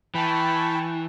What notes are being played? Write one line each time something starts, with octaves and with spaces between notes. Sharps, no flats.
E3 G5 A5 B5 C#6